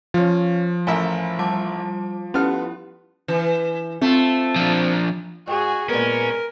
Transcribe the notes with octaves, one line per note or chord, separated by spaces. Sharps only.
F3 C#4 F4
A1 A#4 E5 G#5 B5
G3 A5 D6
B3 C#4 E4 G4 A4 F6
E3
A3 C4 F4
F3 D4
G#2 F#4 G#4
A#2 G#3 B3 C#4 A#4